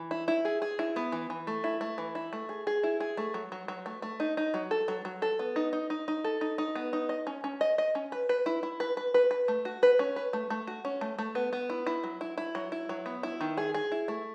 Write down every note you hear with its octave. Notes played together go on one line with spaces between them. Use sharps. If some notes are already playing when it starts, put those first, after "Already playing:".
Already playing: E3
E4
E4
G#4
G#4
E4
B3
E3
E3
A3
E4
A3
E3
E4
A3
G#4
G#4
E4
G#4
A3
F#3
F#3
F#3
A3
A3
D#4
D#4
F#3
A4
F#3
F#3
A4
B3
D#4
D#4
D#4
D#4
A4
D#4
D#4
B3
D#4
D#5
C#4
C#4
D#5
D#5
C#4
B4
B4
E4
E4
B4
B4
B4
B4
A3
F#4
B4
C#4
B4
A3
A3
F#4
C#4
A3
A3
B3
B3
E4
E4
F#3
E4
E4
F#3
E4
F#3
B3
E4
D#3
G#4
G#4
E4
A3